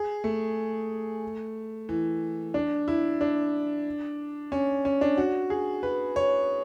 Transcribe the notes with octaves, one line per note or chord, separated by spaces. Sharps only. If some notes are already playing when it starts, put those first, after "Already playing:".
Already playing: G#4
A3
E3
D4
E4
D4
C#4
C#4
D4
F#4
G#4
B4
C#5